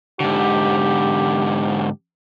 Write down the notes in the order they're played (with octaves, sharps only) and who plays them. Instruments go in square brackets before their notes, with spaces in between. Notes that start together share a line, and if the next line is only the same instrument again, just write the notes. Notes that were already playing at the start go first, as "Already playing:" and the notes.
[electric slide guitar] G#2 D3 [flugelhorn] G4